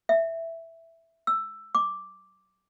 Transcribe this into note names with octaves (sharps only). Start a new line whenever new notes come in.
E5
E6
D6